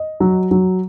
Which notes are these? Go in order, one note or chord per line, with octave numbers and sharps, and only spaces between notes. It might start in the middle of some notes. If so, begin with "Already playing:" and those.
Already playing: D#5
F#3
F#3